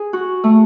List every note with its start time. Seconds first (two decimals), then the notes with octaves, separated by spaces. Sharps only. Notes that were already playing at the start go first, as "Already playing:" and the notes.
Already playing: G#4
0.13 F#4
0.44 A3